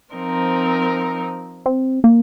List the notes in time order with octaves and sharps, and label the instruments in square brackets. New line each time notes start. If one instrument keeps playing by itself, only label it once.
[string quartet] F3 C4 D#4 A#4
[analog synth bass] C4
A#3